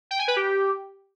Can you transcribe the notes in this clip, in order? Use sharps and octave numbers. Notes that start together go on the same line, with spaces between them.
G5
G#5
B4
G4